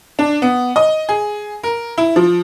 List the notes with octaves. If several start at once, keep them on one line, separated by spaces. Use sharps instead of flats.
D4
B3
D#5
G#4
A#4
E4
F3